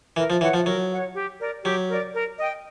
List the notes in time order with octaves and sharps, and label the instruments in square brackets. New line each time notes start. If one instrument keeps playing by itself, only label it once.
[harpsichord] E3 [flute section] A#4
[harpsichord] F3
[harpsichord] E3 [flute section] C#5 F#5
[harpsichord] F3
[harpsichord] F#3 [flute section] A#4
[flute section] C#5 F#5
G4
A#4 D5
[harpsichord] F#3 [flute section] G4
[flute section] A#4 D5
A#4
D#5 G5